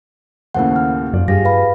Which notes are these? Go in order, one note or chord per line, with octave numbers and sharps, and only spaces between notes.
D#2 A2 C#3 A#3 C5 F#5
F6
F#2 F4 D5
G2 F4 G4 G#4 A#6
B4 F5 B5